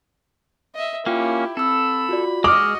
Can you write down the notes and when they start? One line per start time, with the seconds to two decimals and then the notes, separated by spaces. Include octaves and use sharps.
0.75 D#5 E5
1.06 A#3 C#4 E4 F4 G4 G5
1.57 C4 A4 B5 E6
2.09 F4 F#4 D5
2.44 G#3 F#4 D#5 D6 D#6 F6